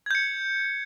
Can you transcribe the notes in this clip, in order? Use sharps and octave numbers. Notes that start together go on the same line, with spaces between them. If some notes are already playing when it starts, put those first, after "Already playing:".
G6 G#6 C#7